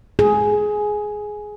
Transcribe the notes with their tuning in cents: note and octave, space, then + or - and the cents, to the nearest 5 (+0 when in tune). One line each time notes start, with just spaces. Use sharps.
G#4 +10